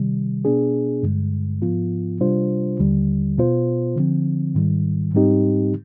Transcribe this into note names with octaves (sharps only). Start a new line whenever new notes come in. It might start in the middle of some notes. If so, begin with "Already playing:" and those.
Already playing: C3 D#3 G3
B2 B3 D4 G#4
G2 D3 G#3
G#2 F3 B3 F4
C3 G3 D4 F4 C5
D#2 D3 G3
B2 B3 F4 C5
D3 F3 C4
G#2 D#3 G3
G#2 G3 C4 D#4 G4